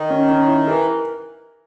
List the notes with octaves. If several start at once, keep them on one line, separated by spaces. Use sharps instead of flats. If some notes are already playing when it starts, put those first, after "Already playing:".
Already playing: D#3
C#4
C#4
E4
E3 A#4